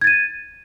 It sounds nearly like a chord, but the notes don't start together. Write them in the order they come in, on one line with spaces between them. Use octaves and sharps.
G#6 A6 D#7